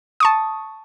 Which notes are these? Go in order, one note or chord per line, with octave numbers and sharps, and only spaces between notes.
A5 C#6 D#6